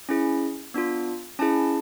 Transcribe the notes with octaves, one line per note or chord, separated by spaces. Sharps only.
C#4 E4 G#4
B3 D4 F4
C#4 E4 G#4 A5